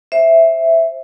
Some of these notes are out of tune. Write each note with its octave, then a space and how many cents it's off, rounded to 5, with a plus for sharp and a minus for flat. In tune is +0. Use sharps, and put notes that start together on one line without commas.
C5 +15 E5 +0